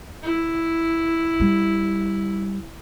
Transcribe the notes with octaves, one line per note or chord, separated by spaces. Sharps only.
E4
G3